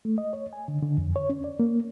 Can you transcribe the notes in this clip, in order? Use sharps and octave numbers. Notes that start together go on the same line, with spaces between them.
A3
D#5
C#5
G#5
D3
D3
F2
C#5
C#4
D5
A#3